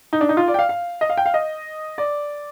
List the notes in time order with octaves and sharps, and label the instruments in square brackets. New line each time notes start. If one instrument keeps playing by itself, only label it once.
[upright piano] D#4
D4
D#4
F4
D5
G5
F5
F5
D#5
F5
G5
F5
D#5
D5